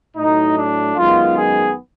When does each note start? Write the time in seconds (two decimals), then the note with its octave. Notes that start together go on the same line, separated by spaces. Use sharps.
0.16 A2 F#3 A3 D#4
0.57 D4
0.96 F#2 D#3 G#3 B3 F4
1.36 G#4